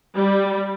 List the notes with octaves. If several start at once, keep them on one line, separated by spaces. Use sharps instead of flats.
G3